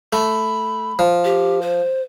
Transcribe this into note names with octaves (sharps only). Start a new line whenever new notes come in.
A3 B5
F3
G4
C5